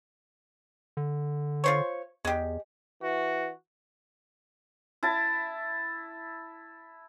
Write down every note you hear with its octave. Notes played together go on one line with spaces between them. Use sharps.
D3
F4 C5 C#5
E2 G#3 G4
E3 F#4
E4 A5